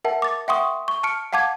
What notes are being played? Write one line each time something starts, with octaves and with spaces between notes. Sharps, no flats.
A#4 E5 F#5 A5
D6 A6
E5 F#5 G5 C6 C#6 D#6
C#6
A5 F6 C#7 D7
F5 F#5 A5 D6 G#6